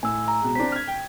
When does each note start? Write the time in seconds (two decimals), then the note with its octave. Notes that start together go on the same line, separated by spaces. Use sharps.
0.03 A2 G#5 E6
0.28 A#5
0.40 B2 G#3
0.55 C4 D4 B6
0.72 F6 G#6
0.87 G5